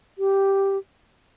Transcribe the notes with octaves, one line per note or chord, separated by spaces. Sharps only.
G4